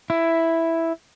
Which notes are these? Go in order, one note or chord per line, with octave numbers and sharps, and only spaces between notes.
E4